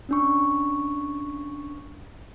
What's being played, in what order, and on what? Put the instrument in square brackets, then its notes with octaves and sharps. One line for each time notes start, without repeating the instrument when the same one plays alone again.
[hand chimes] C#4 D4 C#6